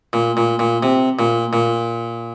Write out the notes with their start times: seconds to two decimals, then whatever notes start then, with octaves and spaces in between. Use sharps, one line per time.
0.13 A#2
0.37 A#2
0.59 A#2
0.83 C3
1.19 A#2
1.53 A#2